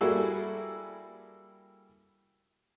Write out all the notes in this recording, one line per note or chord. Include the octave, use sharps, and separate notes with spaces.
G3 A#3 E4 F#4 G#4 A4